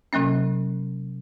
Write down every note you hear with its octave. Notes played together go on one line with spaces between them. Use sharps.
C3 F#3 A#3 C#4